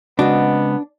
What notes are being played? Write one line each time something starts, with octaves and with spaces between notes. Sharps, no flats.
C#3 G#3 B3 C4 D4 F#4 D#5